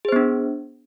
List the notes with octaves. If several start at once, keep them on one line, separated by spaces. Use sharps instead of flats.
B3 D4 G#4 C5